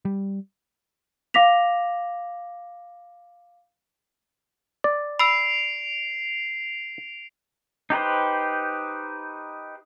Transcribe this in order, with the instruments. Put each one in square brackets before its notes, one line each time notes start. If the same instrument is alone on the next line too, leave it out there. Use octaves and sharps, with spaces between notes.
[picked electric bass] G3
[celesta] F5 D6 A#6 B6 F7
[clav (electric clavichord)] D5
[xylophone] B5 E6 [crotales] C7 D7 F7
[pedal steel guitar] D#4 G4 B4 C5